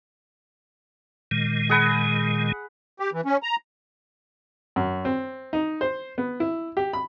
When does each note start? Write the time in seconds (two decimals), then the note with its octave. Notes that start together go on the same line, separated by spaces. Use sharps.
1.31 A#2 D#3 G#3
1.70 G#4 F#5 B5
3.00 G4
3.13 E3
3.25 C#4
3.43 A#5
4.76 F#2
5.05 C4
5.53 D#4
5.81 C5
6.18 B3
6.40 E4
6.77 G4
6.93 B5